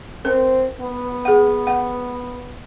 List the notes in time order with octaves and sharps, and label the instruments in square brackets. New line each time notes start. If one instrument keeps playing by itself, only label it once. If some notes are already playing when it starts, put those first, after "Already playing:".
[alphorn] C4 [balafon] A#4
[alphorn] B3
[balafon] G#4 F#5
F#5